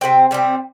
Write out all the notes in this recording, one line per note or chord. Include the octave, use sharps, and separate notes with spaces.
C3 G3 C4 G5
C3 G3 C4